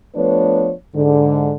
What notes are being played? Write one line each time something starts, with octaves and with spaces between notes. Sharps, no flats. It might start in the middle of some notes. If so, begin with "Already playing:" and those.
F3 A3 B3 D4 B4 C#5
G#2 D3